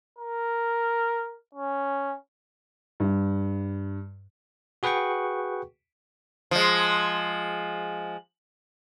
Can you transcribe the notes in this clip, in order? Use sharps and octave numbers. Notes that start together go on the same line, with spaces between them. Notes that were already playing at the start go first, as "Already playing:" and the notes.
A#4
C#4
G2
F#4 G#4 B4 F#5 G5 C#6
F3 G#3